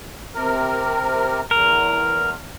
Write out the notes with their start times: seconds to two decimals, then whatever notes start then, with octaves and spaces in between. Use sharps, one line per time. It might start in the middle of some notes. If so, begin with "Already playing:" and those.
0.35 C3 A#4
1.51 E2 A#4